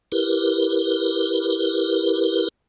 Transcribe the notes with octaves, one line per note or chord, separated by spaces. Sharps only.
E4 G4 A#4 B4